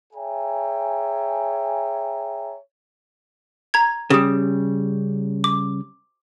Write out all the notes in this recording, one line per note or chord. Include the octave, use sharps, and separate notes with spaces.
G#4 C#5 E5 G5 G#5 A#5
A#5 G#6
C#3 G3 G4 D#6
D6